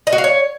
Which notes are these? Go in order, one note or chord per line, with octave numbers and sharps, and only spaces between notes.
D#5
F#4
F5
C#5